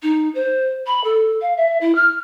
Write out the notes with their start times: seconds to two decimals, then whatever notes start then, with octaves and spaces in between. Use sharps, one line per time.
0.02 D#4
0.34 C5
0.86 B5
1.03 A4
1.41 F5
1.56 E5
1.80 E4
1.95 F6